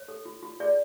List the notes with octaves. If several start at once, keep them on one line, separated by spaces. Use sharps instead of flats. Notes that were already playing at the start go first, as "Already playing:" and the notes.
Already playing: C#5
A4
F4
F4
G#4 D5